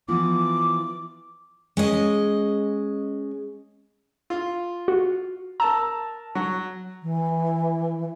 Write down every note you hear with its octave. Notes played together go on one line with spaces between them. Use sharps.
E3 F3 B3 D6
G#3 C#4 D#5
F4
F#4
A#4 A5 A#5 E6
F#3
E3